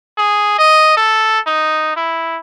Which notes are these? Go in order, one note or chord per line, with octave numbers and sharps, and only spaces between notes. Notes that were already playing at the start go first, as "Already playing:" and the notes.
G#4
D#5
A4
D#4
E4